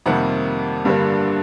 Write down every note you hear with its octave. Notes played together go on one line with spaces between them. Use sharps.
F2 C3 D#3 G3 A#3 F#5
G2 D3 G3 A#3